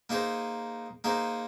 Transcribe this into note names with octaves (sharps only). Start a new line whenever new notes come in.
A#3 D#4 G#4 C5
A#3 D#4 G#4 C5